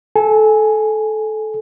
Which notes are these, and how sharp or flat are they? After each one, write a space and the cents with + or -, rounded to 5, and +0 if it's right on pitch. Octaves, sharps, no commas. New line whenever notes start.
A4 -20 G#5 +0